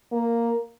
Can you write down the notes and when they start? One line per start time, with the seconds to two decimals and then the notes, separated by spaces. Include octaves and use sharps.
0.12 A#3